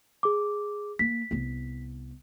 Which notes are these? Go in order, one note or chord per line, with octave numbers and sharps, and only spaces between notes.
G#4 D6
A#3 B6
C2 B3